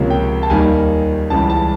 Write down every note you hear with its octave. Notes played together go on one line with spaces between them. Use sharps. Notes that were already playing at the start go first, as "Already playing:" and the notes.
Already playing: C#2 C3 F3 A#3 C#4
G5
A5
D#2 D#3 G3 A#3 G#5
C#2 C#3 E3 G3 A5
A5